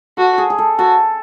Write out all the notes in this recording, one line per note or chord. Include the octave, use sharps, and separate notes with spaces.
F#4 A4
G#4
G#4
A4
F#4 A4